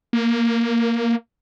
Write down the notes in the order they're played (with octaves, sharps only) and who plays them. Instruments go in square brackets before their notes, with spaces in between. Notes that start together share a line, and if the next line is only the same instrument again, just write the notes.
[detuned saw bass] A#3